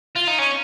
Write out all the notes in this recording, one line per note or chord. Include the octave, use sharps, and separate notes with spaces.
F4
D#4
C#4